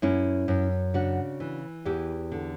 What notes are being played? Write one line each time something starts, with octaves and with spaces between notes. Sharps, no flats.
F#2 C#4 E4
F#2
C#3 D4 F#4
E3
E2 E4 G4
D3